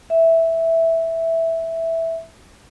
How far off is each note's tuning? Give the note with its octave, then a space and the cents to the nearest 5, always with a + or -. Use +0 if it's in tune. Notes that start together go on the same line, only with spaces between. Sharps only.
E5 -5